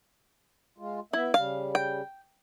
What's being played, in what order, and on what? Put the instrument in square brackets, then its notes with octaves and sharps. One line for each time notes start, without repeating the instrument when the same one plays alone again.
[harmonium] G#3 F4
[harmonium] B3 E5 [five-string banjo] E4
[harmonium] C#3 G3 [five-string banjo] F5
[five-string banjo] G5